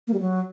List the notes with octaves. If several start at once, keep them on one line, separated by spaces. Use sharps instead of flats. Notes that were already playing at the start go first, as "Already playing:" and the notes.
A#3
G3
F#3